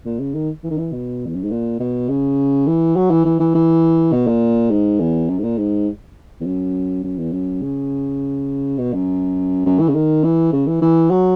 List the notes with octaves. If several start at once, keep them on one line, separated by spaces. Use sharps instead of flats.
A#2
C#3
D#3
E3
D#3
E3
B2
E2
F#2
G#2
A#2
B2
C#3
E3
F#3
E3
E3
E3
E3
B2
A#2
G#2
E2
F#2
G#2
A#2
G#2
E2
F#2
F#2
E2
F#2
C#3
B2
F#2
F#2
E3
C#3
D#3
E3
C#3
E3
E3
F#3